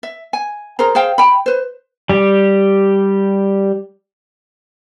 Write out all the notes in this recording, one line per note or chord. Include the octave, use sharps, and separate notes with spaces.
E5
G#5
G#4 A#4 C5 A#5
G#4 C5 F5 G5
G5 B5
B4 C5
G3 G4